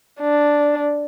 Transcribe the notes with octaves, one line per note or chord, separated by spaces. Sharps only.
D4